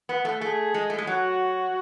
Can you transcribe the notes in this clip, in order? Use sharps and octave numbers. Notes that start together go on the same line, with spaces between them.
B3
A3
A3 G#4
G#3
A3
G#3
F#3 F#4